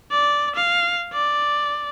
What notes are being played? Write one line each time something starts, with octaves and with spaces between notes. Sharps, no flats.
D5
F5
D5